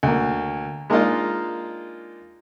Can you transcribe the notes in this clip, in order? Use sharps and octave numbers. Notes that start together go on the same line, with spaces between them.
D2 A#3
G#3 A#3 D4 D#4 F4